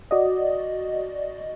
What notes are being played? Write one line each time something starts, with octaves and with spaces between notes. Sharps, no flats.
F#4 D5 D#5